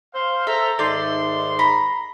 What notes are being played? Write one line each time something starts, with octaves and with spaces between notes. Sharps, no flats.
C5 F5
A4 C5 E5 A#5
G#2 D#3 A3 D5 C6 G6
A#5 B5